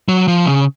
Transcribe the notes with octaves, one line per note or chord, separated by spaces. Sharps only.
F#3
F3
C#3